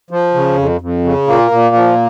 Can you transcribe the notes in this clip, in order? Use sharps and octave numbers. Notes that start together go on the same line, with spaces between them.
F3
C#3
F2
F2
C#3
A#2 A#3
A#2
F3